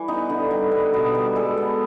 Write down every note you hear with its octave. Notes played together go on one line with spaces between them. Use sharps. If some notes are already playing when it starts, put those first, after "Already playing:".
Already playing: E3 G3
B3 D#4
D3
G3
B3
B2
G3
G#3 A4
B3